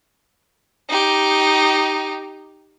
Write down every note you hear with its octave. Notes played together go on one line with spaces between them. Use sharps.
D#4 G4